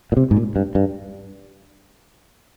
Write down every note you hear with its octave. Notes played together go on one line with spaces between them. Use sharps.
A#2
C3
G#2
A#2
G2
G2